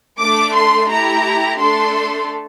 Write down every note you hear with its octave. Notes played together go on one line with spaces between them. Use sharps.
A3 D4 A4 D6
C6
A3 E4 G4 A#5
A3 D4 A4 C6